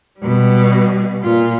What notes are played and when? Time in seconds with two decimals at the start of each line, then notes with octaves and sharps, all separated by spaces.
0.20 B2 G3
1.23 A#2 F4